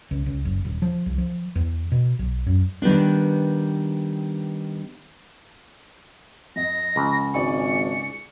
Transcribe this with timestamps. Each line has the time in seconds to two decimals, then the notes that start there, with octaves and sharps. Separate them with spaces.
0.11 C#2
0.26 C#2
0.45 F#1
0.65 D#1
0.82 F3
1.06 C2
1.18 F3
1.56 E2
1.92 B2
2.19 B1
2.46 F#2
2.82 D#3 G3 B3 D4
6.56 F2 D#5 A#6
6.96 C#2
7.34 G#1 D5 G#5 C#6 C#7